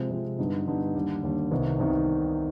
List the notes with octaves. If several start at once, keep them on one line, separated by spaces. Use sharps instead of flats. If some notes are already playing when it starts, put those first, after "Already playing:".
Already playing: C3 F3 G#3 C4
C3 F3 G#3 C4
G2 D3 G3 B3 D#4
G2 D3 G3 B3 D#4
D#2 D3 G3
D#2 D3 G3
C2 C3 D#3 B3 D#4
C2 C3 D#3 B3 D#4